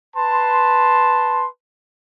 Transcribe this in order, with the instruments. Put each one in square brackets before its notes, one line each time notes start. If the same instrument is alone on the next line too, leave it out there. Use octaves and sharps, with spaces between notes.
[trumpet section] B4 A5 C6